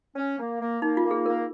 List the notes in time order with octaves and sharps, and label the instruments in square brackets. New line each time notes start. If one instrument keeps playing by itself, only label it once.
[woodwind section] C#4
A#3
A#3
[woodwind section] A#3 [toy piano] D#4
[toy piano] F4
[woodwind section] A#3
[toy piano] G#4
[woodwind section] A#3 [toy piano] A#4